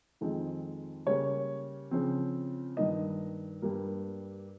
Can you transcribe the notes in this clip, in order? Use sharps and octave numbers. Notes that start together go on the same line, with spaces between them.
F2 D#3 G#3 C4
C#3 G3 A#3 C#5
C#3 F3 C4
G2 D#3 A#3 D#5
G2 G3 A#3